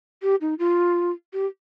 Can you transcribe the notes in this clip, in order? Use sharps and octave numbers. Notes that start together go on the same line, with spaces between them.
G4
D#4
F4
G4